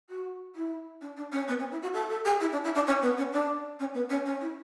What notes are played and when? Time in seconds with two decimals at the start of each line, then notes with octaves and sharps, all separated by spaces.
0.09 F#4
0.55 E4
1.01 D4
1.16 D4
1.31 C#4
1.47 B3
1.59 C#4
1.70 E4
1.82 F#4
1.93 A4
2.09 A4
2.24 G#4
2.40 E4
2.51 D4
2.63 E4
2.74 D4
2.86 C#4
3.01 B3
3.17 C#4
3.32 D4
3.79 C#4
3.94 B3
4.09 C#4
4.25 C#4
4.40 E4